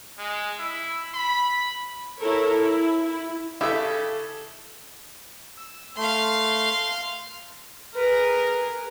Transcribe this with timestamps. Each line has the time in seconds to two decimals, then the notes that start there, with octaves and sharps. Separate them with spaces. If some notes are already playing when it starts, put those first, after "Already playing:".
0.18 G#3
0.58 E4
1.14 B5
2.20 E4 A4 A#4 C#5
2.62 E4
3.06 E4
3.61 C#3 E4 G4 A4 E5
5.57 E6
5.97 A3 F5 C6
7.95 G#4 A#4 B4